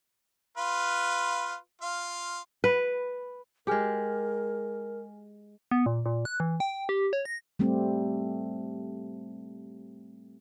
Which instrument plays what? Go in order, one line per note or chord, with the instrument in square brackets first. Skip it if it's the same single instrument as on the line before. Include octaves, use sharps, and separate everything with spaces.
[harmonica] F4 B4 F5
F4 F5
[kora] B4
[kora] G#3 G4 [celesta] G#4 G#5 F6 [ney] A#4
[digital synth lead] B3
A#2
A#2
F#6
E3
G5
G4
C#5
A#6
[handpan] G3 A3 C4 G4